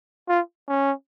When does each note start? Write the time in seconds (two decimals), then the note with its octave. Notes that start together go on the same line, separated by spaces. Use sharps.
0.28 F4
0.68 C#4